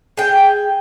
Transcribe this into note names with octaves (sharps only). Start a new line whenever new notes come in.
G#4 G5